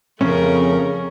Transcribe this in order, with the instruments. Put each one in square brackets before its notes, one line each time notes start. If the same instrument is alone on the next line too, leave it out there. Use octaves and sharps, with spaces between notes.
[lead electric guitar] F2 G#2 [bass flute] C#3 [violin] A3 A#4 [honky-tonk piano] C#4